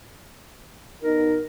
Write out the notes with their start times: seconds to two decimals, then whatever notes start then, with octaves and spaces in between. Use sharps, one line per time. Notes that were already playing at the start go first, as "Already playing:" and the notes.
1.03 B2 D#4 A#4